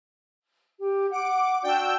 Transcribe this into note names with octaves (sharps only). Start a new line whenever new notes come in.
G4
F#5 D6
D4 F#4 D5 G5 E6